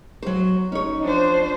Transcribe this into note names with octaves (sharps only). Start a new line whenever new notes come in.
F#3 C5
F#1 C#4 D#4 C#5
F1 F3 D4 C5